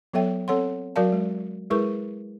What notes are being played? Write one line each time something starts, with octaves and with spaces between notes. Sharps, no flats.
F#3 B3 A4 C#5 E5 G5
C4 A4 C#5 F#5 C6
F#3 F#4 A#4 D5 F5 A5
G#3
G#3 E4 G#4 A#4 B4 C#6